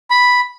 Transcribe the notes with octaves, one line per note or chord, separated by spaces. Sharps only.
B5